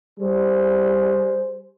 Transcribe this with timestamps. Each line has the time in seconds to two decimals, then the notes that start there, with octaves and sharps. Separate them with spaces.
0.20 G3 G#4 C5